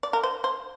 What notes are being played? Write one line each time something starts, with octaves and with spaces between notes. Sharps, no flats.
D5
A#4
C5
C5